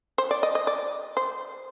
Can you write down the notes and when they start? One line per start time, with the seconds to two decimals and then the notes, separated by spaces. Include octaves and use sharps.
0.18 C5
0.31 D5
0.43 D#5
0.55 D#5
0.67 D5
1.17 C5